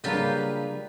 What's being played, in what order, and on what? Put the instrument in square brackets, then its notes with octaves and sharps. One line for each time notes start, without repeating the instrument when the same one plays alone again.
[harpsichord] C#3 F#3 A#3 [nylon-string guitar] G3 D4 [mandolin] F4 G4 B4